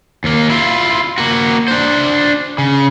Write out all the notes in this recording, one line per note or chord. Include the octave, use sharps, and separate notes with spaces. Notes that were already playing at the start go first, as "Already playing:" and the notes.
D#2 A#3
E4 F4
A#3 F#4
D4 C5
C#3